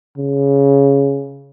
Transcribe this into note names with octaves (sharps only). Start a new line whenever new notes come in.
C#3